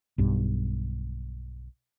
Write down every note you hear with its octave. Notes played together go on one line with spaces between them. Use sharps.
B1 G2